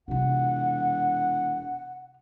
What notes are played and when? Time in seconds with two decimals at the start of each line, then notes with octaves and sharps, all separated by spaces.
0.08 E1 C3 F4 F#5